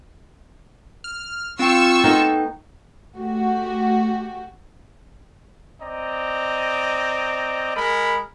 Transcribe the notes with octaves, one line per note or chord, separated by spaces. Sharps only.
F6
C4 F4 G5 C#6 E6
B3 D#4 A4 G5
A3 F#4 G4
C4 D5 D#5 A#5
G#3 A#4 B5